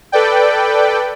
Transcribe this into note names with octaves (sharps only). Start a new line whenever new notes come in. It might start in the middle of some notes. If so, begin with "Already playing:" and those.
A4 B4 D5 G5